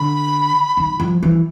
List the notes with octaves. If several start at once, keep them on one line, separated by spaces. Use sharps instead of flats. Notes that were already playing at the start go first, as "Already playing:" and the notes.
Already playing: D3 B5
D#3
F3
E3